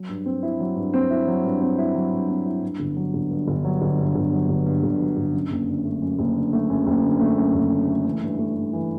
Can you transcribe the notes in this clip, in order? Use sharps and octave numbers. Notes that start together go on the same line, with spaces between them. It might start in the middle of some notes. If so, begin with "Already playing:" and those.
Already playing: F#3
G2
C4
E4
F#3
G2
C4
E4
F#3
G2
C4
E4
F#3
G2
C4
E4
G2
G1
F#3
G1
G2
G1
F#3
G1
G2
G1
F#3
G1
G2
G1
F#3
G1
F#2
F#1
D3
A3
F#2
F#1
D3
A3
F#2
F#1
D3
A3
F#2
F#1
D3
A3
E3
G2
A3
G2
E3